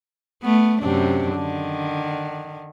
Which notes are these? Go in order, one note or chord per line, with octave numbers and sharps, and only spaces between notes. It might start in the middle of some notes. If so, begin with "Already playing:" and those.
A3 B3
F#2 C3 D4
D3 D#3